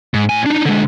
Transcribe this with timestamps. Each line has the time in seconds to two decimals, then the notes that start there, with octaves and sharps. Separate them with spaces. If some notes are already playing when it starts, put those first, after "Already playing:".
0.14 G#2
0.30 A2 G#5
0.46 D4 D#4
0.66 D3 G#3